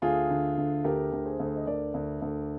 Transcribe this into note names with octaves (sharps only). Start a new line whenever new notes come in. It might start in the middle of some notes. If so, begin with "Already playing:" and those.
D2 F4 G#4
D3
D2
D2 G4 A#4
D2
G#4 C5
D2
D#5
D2 A#4 D5
D2
D2